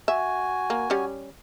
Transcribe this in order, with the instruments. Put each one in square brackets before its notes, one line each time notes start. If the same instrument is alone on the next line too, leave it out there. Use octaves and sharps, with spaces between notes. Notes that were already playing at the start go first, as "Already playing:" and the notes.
[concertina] F#4 G#5 [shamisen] E5
[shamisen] A#3
G3 C#4